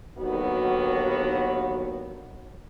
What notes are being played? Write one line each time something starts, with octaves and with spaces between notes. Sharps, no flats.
D#2 D3 D#3 F#3 B3 F#4